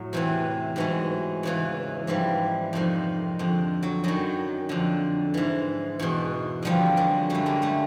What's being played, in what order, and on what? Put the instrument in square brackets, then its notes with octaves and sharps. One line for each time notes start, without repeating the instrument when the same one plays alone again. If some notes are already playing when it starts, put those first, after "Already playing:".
Already playing: [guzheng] A2 F#3
E2 C3 E3
G#2 E3 F#3 G#3
E2 C#3 E3
G#2 E3 F3 G3
F2 C3 D#3
F2 D3
F#3
F#2 D#3 F#3
F2 D3
G#2 E3
E2 B2
F2 D3 F3 G3
F#3 G#3
F#2 D3 G3 A3
G#3 A#3
G3 A3